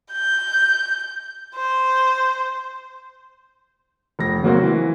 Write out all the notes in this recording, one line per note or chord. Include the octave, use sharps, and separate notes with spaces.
G6
C5
F1 A#6
C#3 F#3 A#3 C4 F#4
E3